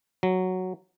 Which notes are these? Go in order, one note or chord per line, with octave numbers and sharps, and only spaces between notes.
F#3